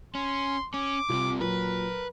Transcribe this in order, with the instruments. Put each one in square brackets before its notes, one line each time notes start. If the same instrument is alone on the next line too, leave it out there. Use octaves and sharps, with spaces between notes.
[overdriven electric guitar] C#4 [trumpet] C6
[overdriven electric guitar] C#4 [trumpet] D6
[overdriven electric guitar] C2 C3 [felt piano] F4
[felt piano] A#2 F#3 [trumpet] A#4 [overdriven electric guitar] B4